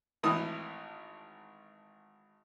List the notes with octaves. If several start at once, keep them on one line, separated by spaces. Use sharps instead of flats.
G#1 A2 E3 D#6